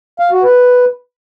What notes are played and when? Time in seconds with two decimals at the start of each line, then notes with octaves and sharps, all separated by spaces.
0.20 F5
0.31 F#4
0.43 B4